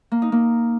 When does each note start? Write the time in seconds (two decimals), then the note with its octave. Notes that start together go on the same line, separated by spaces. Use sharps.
0.11 A#3
0.22 D#4
0.32 A#3